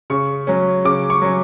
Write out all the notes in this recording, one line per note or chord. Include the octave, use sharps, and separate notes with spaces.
C#3 C#6
F#3 C#4
C#3 D6
C#6
F#3 C#4